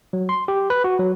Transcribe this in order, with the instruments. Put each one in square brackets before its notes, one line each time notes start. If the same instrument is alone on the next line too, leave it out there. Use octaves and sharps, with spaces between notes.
[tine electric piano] F#3
C6
G4
B4
F#4
F#3